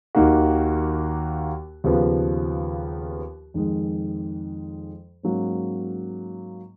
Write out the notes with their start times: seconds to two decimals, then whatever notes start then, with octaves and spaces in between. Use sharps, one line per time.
0.15 D#2 D#3 A#3 D#4 F#4
1.84 D#2 C#3 F3 B3
3.54 F2 D#3 G#3
5.23 G#2 F#3 A#3 C#4